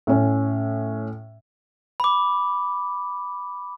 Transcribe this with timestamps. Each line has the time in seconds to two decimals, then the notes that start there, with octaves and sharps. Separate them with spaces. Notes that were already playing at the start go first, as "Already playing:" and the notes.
0.07 A2 C#4
2.00 B5 D6